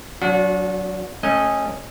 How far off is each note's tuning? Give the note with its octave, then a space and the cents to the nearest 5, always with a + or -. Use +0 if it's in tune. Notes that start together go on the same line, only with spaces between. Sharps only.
F#3 +5 D4 -30 F#4 -35
A3 +0 C#4 -20 D#5 +0